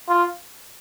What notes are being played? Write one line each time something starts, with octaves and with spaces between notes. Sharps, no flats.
F4